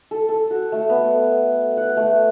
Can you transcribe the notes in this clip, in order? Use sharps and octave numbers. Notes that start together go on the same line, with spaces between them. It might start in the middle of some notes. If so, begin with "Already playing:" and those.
A4
A4
F#4
A3
B3
F#5
A3